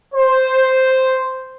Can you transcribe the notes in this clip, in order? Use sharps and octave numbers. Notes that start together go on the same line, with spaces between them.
C5